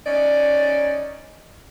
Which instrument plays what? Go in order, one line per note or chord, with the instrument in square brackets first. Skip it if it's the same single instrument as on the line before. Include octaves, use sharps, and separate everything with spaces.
[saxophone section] C#4 D#4 C#5 D5